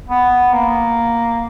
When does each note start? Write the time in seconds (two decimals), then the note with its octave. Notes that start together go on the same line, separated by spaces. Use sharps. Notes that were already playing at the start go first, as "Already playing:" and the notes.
0.08 B3
0.53 A#3